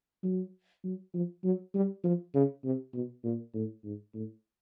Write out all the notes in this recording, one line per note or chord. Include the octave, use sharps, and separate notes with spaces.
F#3
F#3
F3
F#3
G3
F3
C#3
C3
B2
A#2
A2
G#2
A2